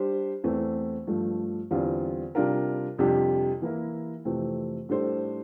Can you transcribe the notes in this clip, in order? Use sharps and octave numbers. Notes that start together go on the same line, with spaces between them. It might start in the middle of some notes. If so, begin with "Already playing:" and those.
Already playing: G3 D4 G4 C5
E2 E3 A3 C4
G2 F3 A3
E2 D3 G3 C4 F4
C3 G3 D4 F4 A#4
F2 C3 G3 D4 G4
E3 A#3 E4 A#4
F2 C3 E3 A3 C4
A2 G3 D4 A4 C5